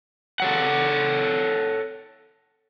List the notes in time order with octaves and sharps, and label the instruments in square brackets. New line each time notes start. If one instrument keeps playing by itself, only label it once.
[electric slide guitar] A4 C#5 F#5